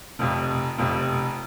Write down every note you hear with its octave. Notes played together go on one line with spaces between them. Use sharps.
F1 F2 C3
F1 F2 C3